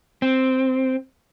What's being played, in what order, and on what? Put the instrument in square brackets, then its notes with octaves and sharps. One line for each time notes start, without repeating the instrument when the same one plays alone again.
[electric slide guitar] C4